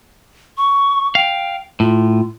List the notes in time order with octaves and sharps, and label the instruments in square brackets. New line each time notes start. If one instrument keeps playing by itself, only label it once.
[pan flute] C#6
[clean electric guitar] F5 [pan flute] G5
[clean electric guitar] A2 [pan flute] F4